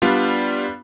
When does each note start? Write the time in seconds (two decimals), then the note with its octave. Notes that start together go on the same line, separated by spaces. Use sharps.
0.02 G3 B3 D4 F4